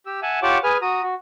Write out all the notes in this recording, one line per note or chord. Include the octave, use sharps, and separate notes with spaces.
G4 E6
E5 F#5 G#5 A5
F4 G4 C#5 F#5 A5 D6
G#4 B4 G#5 F6
F#4 A#5 D#6
F#4